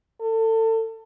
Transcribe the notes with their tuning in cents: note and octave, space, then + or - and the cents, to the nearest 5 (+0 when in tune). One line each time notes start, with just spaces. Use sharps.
A4 +30